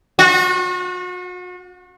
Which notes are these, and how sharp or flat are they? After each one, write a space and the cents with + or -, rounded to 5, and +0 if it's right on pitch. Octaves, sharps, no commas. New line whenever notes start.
F#4 -40